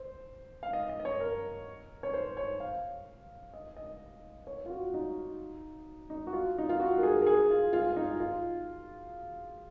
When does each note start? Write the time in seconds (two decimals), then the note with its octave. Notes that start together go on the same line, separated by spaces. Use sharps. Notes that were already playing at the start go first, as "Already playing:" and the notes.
Already playing: C5
0.63 F5
0.73 D#5
0.89 D#5
1.00 D#5
1.05 C#5
1.20 A#4
2.03 C#5
2.14 C5
2.37 C#5
2.60 F5
3.54 D#5
3.77 D#5
4.47 C#5
4.66 F4
4.70 F#4
4.94 D#4
6.10 D#4
6.27 F#4
6.33 F4
6.58 D#4
6.69 F4
6.80 F#4
6.98 A#4
7.03 G#4
7.21 A#4
7.27 G#4
7.50 F4
7.73 F4
7.92 F4
7.96 D#4
8.20 F4